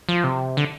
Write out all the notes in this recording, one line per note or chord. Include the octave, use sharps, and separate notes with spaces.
F3
C3
D3